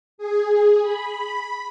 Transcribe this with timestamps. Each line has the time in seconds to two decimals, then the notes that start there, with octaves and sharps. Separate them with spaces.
0.18 G#4
0.82 B5